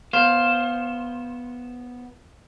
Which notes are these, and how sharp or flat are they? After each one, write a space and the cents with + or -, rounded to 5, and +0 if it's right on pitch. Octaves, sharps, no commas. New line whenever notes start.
B3 -5 C5 +15 F5 +0